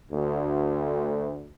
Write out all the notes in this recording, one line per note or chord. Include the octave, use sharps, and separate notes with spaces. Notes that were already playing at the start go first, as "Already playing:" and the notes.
D2